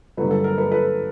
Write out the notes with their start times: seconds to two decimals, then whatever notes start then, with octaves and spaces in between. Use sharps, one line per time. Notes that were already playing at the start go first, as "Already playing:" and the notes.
0.17 G2 D3 F#3 A4 B4
0.31 A4
0.44 A#4
0.58 A4 B4
0.71 A4 B4